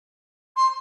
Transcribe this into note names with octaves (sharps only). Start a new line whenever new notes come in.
C6